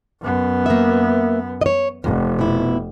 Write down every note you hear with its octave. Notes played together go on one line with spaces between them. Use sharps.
F#2 B3
A#3 E5
C#5 D#5
F1 F2
B2 E4